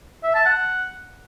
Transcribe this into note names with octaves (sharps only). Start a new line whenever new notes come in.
E5
A5
F#5